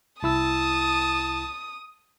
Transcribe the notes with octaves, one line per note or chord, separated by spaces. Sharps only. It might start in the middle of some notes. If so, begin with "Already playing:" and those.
C2 E4 A5 D#6 E6